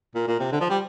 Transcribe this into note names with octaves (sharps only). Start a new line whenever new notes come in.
A#2
A#2
C3
D3
F3
G3